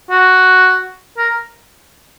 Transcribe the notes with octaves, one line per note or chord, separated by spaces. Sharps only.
F#4
A#4